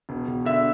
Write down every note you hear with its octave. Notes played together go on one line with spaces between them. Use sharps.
E1
E1
D3 E5